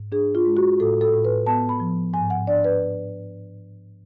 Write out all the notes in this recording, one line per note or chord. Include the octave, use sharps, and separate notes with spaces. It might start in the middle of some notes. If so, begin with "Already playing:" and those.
Already playing: G#2
D4 G#4
F4
G#3
F#4
A2 A4
A4
A2
B4
B3 A5
B5
F3
G#2 G#5
F#5
D4 D5
B4